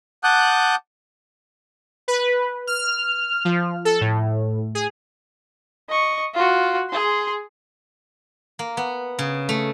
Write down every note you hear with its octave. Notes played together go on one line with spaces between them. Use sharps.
F#5 A5 D6 D#6 F#6 G6
B4
F6
F3
A4
A2
G#4
D#5 C#6
F4 F#4
G#4 C6
A#3
B3
C#3
A3